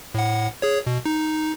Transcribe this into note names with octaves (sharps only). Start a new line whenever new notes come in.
A2 F#5
G#4 C#5
B2
D#4